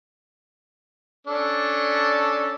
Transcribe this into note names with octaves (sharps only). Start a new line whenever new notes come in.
C#4 D4 A4